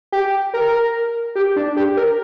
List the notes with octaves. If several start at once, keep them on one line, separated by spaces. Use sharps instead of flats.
G4
A#4
G4
D4
G4
A#4